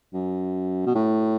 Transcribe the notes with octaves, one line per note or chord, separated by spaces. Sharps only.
F#2
B2
A2